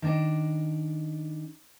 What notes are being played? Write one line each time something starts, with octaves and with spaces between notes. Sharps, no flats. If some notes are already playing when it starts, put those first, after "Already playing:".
D#3 D4 D#5